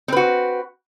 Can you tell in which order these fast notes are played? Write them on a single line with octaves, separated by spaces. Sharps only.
C4 B4 F#4